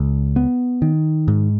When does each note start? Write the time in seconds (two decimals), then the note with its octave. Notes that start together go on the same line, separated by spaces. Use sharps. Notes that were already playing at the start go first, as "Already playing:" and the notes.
Already playing: C#2
0.36 B3
0.82 D#3
1.28 G#2